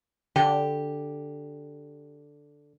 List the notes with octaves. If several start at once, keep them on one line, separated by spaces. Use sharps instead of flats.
D3 G4